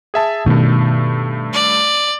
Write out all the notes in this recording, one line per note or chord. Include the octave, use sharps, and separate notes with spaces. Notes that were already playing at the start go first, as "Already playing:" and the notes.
G#4 E5 A5
G2 B2 D#3 A3
D5